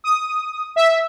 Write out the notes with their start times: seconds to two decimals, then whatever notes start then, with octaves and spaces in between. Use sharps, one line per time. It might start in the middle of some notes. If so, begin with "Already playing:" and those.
0.04 D#6
0.76 E5